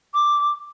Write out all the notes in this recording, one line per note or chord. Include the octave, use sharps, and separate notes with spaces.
D6